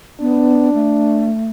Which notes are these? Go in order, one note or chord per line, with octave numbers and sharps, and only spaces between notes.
B3 D4
A3